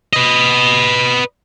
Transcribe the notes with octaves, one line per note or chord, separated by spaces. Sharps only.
B4 D#5